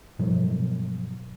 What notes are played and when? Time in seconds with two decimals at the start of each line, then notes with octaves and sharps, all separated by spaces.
0.19 G2 B2 F3 F#3